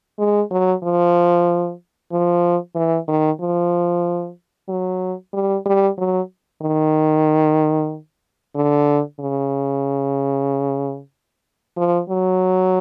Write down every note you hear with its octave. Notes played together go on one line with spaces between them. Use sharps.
G#3
F#3
F3
F3
E3
D#3
F3
F#3
G3
G3
F#3
D#3
D3
C#3
F3
F#3